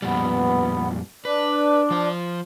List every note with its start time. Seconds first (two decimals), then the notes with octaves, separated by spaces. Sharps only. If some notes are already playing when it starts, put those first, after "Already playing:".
0.02 F2 A#2 G3 B3
1.25 D4 B4
1.91 F3 C5